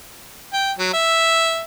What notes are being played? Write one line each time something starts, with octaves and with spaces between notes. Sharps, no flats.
G5
F#3
E5